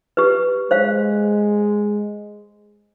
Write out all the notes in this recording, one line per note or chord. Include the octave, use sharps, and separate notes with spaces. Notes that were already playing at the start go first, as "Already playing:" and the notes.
G4 B4
G#3 C5 F5